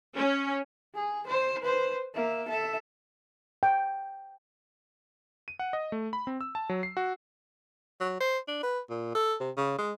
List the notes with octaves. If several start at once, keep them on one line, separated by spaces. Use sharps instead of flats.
C#4
G#4
C5
B4 C5
A#3 E5
A4 E5
G5
D#7
F#5
D#5
A3
B5
C4
E6
A5
F#3
C7
F#4
F#3
C5
D4
B4
A#2
A4
C3
C#3
G#3